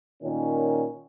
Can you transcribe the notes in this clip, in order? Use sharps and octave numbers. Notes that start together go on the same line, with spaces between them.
A#2 D#3 C#4